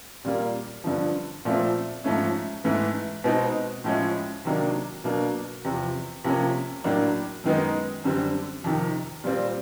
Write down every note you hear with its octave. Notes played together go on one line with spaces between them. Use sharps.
A#2 G3 A#3
G2 D3 F3
A#2 F3 A3 C4
G#2 F3 A3 C#4
G#2 E3 A3
B2 G#3 C4 D#4
A2 F3 G#3 C#4 E4
C3 D#3 F#3 A#3 D4
B2 F#3 A#3 D4
E2 C3 F3
C3 F3 A#3 C#4
A2 F#3 A#3 D4
F#2 D#3 G#3 B3 D#4
F#2 D3 G3 C4
F2 C3 D#3
A#2 G3 C4